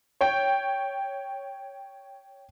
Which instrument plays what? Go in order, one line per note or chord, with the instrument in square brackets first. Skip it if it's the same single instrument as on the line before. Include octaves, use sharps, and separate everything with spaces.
[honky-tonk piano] C#5 G5